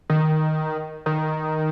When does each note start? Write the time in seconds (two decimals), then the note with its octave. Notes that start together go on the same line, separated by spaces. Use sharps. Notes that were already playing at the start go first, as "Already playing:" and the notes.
0.10 D#3
1.06 D#3